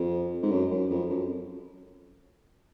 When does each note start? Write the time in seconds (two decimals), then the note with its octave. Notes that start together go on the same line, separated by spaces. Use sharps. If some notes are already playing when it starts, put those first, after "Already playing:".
Already playing: F2
0.42 G#2
0.51 F#2
0.71 F#2
0.90 F2
1.09 F#2